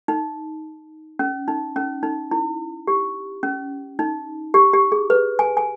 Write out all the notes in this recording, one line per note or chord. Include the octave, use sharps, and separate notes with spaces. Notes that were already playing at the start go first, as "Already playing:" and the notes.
D#4
C#4
D#4
C#4
D#4
E4
G4
C#4
D#4
G4
G4
G#4
B4
G#5
G#5